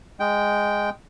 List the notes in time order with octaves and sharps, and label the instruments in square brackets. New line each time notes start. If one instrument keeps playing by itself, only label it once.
[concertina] G#3 G5